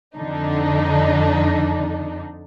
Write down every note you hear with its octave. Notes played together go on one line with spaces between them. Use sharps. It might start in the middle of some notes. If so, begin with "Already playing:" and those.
F2 D3 D4 D#4